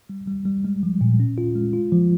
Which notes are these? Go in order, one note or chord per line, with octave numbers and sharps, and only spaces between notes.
G3
G3
G3
G#3
F3
A#2
C#4
F4
G#3
F4
F3